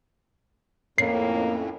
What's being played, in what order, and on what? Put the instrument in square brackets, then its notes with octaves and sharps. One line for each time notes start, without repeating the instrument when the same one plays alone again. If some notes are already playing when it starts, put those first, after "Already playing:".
[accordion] F2 A2 [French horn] A#3 [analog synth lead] C#4 [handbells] C7